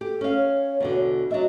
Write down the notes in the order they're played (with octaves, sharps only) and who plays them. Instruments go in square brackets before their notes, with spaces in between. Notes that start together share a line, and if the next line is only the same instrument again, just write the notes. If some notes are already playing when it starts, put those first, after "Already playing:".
[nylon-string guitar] G4 [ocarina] A4
[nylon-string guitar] C#4 F5
[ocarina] C#5
[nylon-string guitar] E2 B2 D3
[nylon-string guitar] F#3 D4 E5 [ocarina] D#5